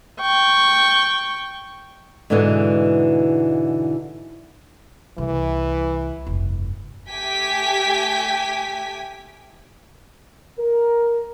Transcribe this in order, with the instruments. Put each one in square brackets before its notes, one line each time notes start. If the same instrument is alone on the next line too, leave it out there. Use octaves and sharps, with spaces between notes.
[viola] G5 C#6
[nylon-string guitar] G#2 B2 D3 E3 G#3
[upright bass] C2 [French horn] E3
[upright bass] F1 G2
[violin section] A3 G4 G5 G#5 G#6 B6
[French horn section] A#4